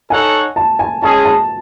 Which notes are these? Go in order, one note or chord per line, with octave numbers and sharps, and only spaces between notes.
D#4 A4 C#5 F#5 G#5
A5
G#5
G#3 C#4 G#4 D#5 A5
A5